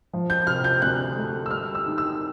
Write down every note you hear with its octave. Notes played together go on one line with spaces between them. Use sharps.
F3
G6
C3 F6
G6
D2 F#6
A3
E6
G3 F6
E6
D#3
E6